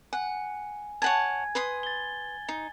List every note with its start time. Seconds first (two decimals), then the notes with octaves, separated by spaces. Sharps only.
0.13 F#5 G#5
1.02 C#5 F#5 G#5 A5 G#6
1.55 B4 C6 D#6
1.83 A6 G7
2.49 D#4